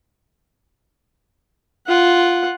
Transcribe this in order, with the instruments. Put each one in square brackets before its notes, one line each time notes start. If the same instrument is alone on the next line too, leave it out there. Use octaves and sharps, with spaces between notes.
[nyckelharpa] F4 F#5